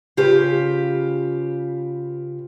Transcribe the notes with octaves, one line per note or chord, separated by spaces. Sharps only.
C#3 F4 G4 B4